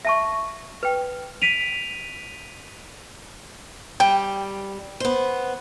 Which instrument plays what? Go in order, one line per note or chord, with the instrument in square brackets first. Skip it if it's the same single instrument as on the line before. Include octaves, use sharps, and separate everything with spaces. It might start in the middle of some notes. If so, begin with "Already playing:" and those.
[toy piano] E5 A5 C#6
B4 G5
[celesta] B6 D7 D#7 F7
[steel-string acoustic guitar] G3 [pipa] G5
[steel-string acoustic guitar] B3 C5